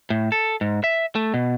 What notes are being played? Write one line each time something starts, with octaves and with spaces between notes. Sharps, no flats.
A2
A4
G#2
E5
A3
B2